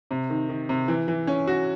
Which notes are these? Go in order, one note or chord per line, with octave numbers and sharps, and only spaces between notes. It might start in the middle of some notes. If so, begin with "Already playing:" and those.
C3
D#3
D#3
C3
E3
E3
C#4
F#4